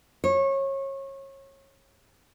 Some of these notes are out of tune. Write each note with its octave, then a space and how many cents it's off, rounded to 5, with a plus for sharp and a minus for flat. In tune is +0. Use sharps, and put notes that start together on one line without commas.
C#5 -25